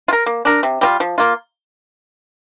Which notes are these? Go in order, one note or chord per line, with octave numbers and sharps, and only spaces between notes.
F4
A#4
A#3
D4 A#4
C3
G3 C4 F4
F3
A#3 F4